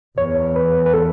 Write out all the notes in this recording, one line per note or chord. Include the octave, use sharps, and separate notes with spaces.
E2 C#5
B4
B4
A4